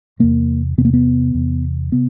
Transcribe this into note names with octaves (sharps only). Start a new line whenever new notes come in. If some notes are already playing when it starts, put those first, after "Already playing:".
E2 C3 A#3
E2 C3 B3
A#3
B3
E2 C3
C3 B3